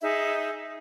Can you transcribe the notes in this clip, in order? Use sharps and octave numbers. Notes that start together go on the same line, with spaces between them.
D#4 G#4 E5